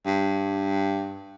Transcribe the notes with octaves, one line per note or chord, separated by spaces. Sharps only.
G2